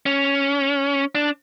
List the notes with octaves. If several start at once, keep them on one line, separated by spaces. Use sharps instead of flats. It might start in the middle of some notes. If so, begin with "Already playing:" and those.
C#4
D4